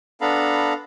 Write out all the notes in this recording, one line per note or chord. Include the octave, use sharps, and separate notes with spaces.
B3 D4 A4 F5 A#5 B5